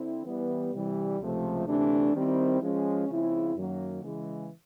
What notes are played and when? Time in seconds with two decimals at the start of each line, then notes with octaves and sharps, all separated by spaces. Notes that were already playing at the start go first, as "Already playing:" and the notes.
Already playing: D3 C4 E4
0.25 E3 G3 B3
0.73 C3 E3 G3
1.21 C#2 C3 F3 A3
1.67 D2 C3 E3 A3 D4
2.14 D#3 G3 C4 E4
2.61 F3 G#3 C#4
3.09 C#3 F3 G#3 C4 E4
3.56 F#2 D#3 F#3 A#3
4.03 C#3 E3 G#3